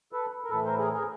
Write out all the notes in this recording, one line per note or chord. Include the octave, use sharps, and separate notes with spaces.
A4 B4
A#4
A2 E3 A4 B4
A#4 C5
G#4 A#4
G#4 A#4